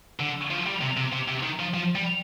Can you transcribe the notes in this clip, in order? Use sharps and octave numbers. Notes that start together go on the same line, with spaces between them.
D3
F3
G3
C3
C3
C3
C3
D#3
F3
F3
G3